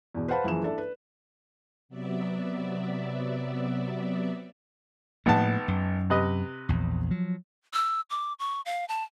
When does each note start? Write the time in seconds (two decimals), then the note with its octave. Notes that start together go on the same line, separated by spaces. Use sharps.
0.14 E2 B2
0.28 B4 C5 F5 F#5 A5 B5
0.44 F#1 E3 F3 G#4 E7
0.64 D4 E4 A4 D5 E5
0.78 B4
1.89 C3 F#3 B3 D5 E5
5.26 G#1 A2 F3 A#3 B3 A5
5.68 F#2
6.10 C3 B4 D#5
6.69 A#1 E2
7.11 F3 F#3
7.74 E6
8.10 D6
8.39 C#6
8.66 F5
8.89 A5